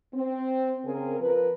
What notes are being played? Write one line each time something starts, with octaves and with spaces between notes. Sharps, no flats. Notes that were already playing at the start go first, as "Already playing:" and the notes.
C4
C#3 C4 G#4 A#4
F3 A#4 B4